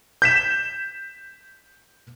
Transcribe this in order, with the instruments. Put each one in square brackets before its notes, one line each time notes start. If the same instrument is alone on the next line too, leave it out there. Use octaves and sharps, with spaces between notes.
[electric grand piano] G6 B6 E7